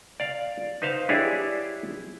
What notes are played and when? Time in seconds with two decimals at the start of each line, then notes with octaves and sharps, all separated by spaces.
0.20 D5 F5
0.82 D#4 B4 C5 F5
1.09 D4 E4 G4 G#4 C#5 D5